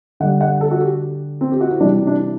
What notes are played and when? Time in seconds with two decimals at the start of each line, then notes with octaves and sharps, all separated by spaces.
0.20 D3 G3 F#5
0.41 F#5
0.61 A4
0.71 F#4
0.81 G4
1.41 C4
1.51 G4
1.61 F#4
1.71 E4
1.80 C3 E3 G3 D4
2.07 D4